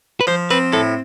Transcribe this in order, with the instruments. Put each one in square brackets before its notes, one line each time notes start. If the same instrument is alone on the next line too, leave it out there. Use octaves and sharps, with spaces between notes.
[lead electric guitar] B4
[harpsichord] F3 [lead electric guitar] C5
[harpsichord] C4 [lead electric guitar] B4
[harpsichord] A2 [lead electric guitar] A4